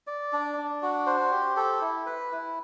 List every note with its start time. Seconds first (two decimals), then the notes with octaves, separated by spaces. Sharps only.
0.07 D5
0.33 D4
0.58 D4
0.82 F#4
1.06 C5
1.31 G4
1.56 A4
1.81 E4
2.06 B4
2.32 E4